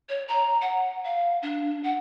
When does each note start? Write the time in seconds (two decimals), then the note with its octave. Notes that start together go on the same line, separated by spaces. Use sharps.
0.09 C#5
0.28 A#5
0.61 F#5
1.04 F5
1.43 D4
1.83 F#5